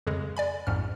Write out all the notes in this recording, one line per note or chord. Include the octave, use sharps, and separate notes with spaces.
F2 C#3 G#3
D5 G#5 B5
A#1 F2 G#2 F6